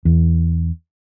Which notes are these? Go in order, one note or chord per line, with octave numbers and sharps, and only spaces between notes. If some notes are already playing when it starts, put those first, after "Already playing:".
E2